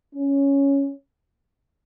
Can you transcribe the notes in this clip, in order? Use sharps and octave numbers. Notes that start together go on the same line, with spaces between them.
C#4